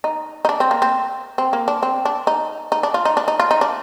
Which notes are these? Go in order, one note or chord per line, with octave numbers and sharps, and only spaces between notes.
D#4
D#4
D4
C4
A#3
C4
C4
A#3
D4
C4
D4
D#4
D#4
D4
F4
D#4
D4
D#4
F4
D#4
D4